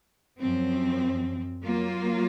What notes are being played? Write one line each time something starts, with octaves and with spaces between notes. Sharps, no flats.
F#2 F3 C4
F#3 A#3 F4